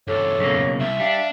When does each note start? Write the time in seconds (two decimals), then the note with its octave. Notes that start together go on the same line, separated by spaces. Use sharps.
0.08 E2 G2 A4 C#5 D6
0.39 B1 C#3 A#3
0.79 C2 E5
1.00 G3 D4 F5